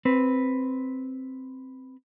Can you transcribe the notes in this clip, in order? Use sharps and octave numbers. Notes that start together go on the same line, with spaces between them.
C4 B4